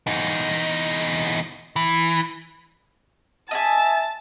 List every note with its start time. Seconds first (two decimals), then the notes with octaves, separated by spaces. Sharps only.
0.07 E2 D#4
1.76 E3
3.51 D#5 E5 G#5 A5